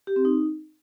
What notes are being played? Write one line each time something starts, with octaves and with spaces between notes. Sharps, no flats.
G4
C4
D#4